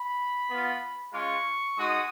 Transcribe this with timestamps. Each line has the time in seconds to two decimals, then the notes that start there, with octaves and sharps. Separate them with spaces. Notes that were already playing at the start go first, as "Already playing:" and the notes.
Already playing: B5
0.49 B3 F4
1.13 G#3 C#4 F4 C#6
1.77 G#3 D#4 F#4 D#6